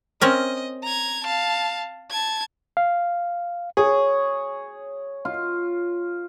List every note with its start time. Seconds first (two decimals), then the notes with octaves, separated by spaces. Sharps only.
0.21 C4 C#4 A#4 D#5
0.83 A#5 G#6
1.23 F5 A5
2.11 A5 G#6
2.77 F5
3.77 G#4 C#5
5.25 F4